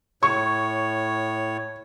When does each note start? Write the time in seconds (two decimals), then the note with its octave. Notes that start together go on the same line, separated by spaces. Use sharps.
0.23 A2 C#5 C#6